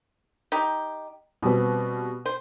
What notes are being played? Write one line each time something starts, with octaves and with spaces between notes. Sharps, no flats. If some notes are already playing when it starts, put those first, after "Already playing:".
D#4 G4
B2 G3 C4 G4 B4
C5